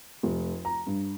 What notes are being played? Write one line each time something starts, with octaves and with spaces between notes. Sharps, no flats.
F1
A#5
G2